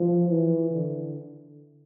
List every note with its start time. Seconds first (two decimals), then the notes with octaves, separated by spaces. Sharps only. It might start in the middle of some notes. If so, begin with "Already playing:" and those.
Already playing: F3
0.29 E3
0.70 D3